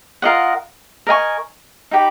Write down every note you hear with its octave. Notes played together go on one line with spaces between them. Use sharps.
F4 A#4 D#5 F#5
A#4 D#5 G#5 C#6
D#4 G4 B4